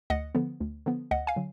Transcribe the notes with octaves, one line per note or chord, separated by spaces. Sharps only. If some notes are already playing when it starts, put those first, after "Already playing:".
D2 D#5 F#5
D3 F3 B3
D2
D3 F3 B3
D2 D#5 F#5
F5 G#5
D3 F#3